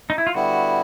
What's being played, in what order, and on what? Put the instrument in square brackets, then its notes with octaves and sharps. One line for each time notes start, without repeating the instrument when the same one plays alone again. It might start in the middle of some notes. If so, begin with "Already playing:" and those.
[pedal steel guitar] D#4
E4
F4
[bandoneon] D3 G3 B3 E4 [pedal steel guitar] F#4